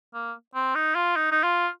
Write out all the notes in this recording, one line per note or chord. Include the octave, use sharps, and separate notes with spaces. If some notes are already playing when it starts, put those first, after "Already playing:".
A#3
C4
D#4
F4
D#4
D#4
F4